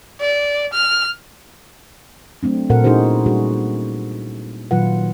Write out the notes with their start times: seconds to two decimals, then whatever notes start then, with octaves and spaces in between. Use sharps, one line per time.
0.20 D5
0.74 F6
2.43 F#3 A3 C4 D4
2.70 A#2 F#4 A4 A#4 C5 F#5
2.84 C#4 D#4 E4 F#4 G#4 C5
3.26 G3 A#3 D4 F#4 G#4
4.71 A#2 D#3 F#3 F4 B4 F#5